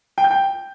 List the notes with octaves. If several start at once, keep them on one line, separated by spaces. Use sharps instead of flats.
G5
G6
G5